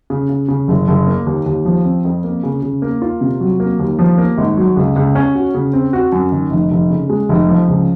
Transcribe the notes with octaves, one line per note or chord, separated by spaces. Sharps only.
C#3
C#3
C#3
F#1
F#1
A#3
D#2
D#2
F3
C4
F2
A#3
C#3
C#3
A#3
F4
C3
F#3
A#3
D#2
F3
A#3
G#1
F#3
C#2
C#2
C#4
F#4
C#3
C4
F#4
F#2
D#3
F1
F1
C#3
G#3
F1
F3
C#2